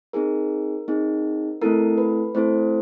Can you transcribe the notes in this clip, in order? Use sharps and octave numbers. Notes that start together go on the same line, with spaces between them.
C4 D#4 G#4 A#4
C4 D#4 G#4
A3 C4 E4 A4 A#4
B4
A3 C4 E4 A4 C5